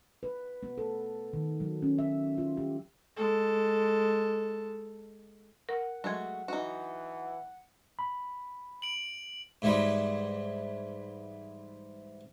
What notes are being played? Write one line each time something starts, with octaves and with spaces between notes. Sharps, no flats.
B4
B3
A4
D#3
F#3
C#4
E5
F4
G4
G#3 A4
A#4 F#5
F#3 G#3 A3 F#4 G#6
E3 D#4 F#4
B5
D7 F#7
G#2 E3 G3 G#3